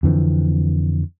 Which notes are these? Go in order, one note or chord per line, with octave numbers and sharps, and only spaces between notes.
F2 D3 E3 C4